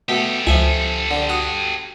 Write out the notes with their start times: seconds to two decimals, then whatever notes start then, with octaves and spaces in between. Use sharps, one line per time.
0.09 B2 A3 G4 A4
0.47 C#2 F3 E5 G#5
1.11 D3
1.29 F#4 D#6